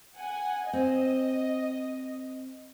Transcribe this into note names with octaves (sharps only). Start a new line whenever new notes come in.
F#5 G#5
C4 D#5